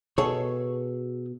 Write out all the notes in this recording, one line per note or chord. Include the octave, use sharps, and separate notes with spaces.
B2 G#4 A4 C#5